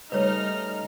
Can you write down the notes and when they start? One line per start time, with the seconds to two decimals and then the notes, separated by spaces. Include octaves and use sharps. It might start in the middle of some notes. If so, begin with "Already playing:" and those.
0.12 C#3 G3 A3 D#4 B4 C#5 F6